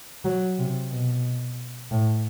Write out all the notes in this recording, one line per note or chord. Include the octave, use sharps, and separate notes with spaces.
F#3
C3
B2
A2